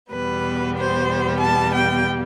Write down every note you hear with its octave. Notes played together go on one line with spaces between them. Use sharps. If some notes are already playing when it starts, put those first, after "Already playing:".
E2 B2 G3 B3 B4
C5
A5
G5